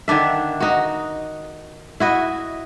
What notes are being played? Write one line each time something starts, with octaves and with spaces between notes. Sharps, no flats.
D3 D#3 D4 E5
D#4 F#4
E4 F#4 D#5